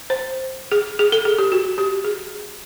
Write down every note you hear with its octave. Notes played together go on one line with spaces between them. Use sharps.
C5
G#4
G#4
A4
G#4
G4
F#4
G4
G#4